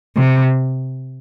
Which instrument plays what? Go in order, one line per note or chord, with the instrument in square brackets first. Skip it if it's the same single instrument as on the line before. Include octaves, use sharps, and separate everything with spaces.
[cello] C3